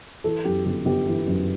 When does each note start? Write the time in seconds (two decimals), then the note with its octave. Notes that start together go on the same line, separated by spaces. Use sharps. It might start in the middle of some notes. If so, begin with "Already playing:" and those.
0.24 E3 A4
0.45 F#2 G4
0.65 G1 G4
0.85 G1 G4
1.07 E3
1.27 F#2